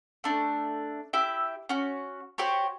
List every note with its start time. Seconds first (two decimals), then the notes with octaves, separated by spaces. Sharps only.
0.24 A3 D4
1.13 E4 G4 E5
1.69 C#4 F#4
2.38 F#4 G4 C5 C#5